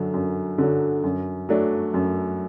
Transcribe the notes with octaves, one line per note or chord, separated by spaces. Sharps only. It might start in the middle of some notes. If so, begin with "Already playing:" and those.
Already playing: F#2 D3 F#3
F#2
D3 F#3
F#2
F#3 A3 D4
F#2